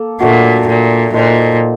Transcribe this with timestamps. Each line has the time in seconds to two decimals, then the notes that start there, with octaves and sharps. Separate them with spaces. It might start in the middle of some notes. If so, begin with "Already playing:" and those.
Already playing: A#3 A4
0.20 A#2 F#3 A3 D4 F#4
0.68 A#2
1.13 A#2 D#4 A4 C5